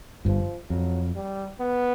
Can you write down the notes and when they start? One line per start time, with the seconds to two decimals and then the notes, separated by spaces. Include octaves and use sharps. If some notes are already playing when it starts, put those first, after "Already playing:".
0.25 G1 G2 F3
0.70 F2 F#3
1.16 G3
1.61 B3